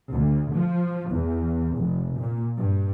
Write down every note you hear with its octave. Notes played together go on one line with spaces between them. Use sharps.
D2
F3
E2
F1
A#2
G2